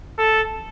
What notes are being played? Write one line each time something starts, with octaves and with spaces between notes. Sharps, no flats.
A4